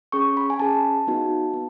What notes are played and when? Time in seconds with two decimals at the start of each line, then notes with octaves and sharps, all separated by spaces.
0.12 C#4 G#4 C#6
0.37 B5
0.50 G#5
0.60 C#4 G#4 A5
1.07 B3 D#4 F#4
1.54 B3